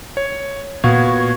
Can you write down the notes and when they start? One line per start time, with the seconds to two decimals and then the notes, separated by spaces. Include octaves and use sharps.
0.17 C#5
0.84 A#2 B3 F#4 F5 C#6 G#6